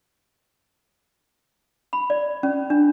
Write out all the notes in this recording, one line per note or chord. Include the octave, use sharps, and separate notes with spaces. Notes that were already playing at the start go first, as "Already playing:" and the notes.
B5
D5
C#4
D4